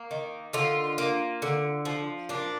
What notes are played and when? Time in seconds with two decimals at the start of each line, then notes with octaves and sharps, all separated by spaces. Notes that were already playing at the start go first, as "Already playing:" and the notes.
Already playing: A#3
0.11 D#3
0.53 D3 F4
0.98 A#3
1.42 D3
1.85 F3
2.29 A#2 D4